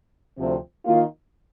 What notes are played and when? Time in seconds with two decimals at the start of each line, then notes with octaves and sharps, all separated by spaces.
0.38 D2 C3 F3 C4
0.85 D#3 A#3 F4